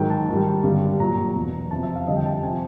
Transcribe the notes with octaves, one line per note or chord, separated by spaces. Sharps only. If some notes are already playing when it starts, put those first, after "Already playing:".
Already playing: G#2 D#3 F#3 G5
A5
G#2 D#3 G3
G2 D3 G3
A#2 F#3 A#5
E2 B2 F#3
F2 C3 F3 A5
E5
F5
F2 D3 G3 D#5
G5
A5
G5
C3 F3 G#5